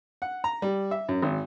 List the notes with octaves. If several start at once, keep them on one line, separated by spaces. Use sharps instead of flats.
F#5
A#5
G3
E5
F#2
G#1